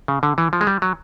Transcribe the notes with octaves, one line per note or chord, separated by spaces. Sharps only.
C#3
D3
E3
F3
G#3
G3
F#3